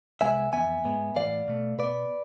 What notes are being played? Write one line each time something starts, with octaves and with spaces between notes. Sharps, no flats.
C2 C3 G#3 B3 E5 G#5
F2 E3 B3 E5 G#5
G#2 G#3 B3
A2 E3 B3 D5 F5
B2 A3
B2 B3 B4 D5